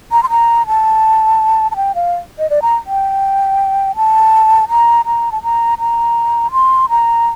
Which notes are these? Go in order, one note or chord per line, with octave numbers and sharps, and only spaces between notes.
A#5
C6
A#5
A5
A5
G5
F5
D#5
D5
A#5
G5
A5
A#5
A#5
A5
A#5
A#5
C6
A#5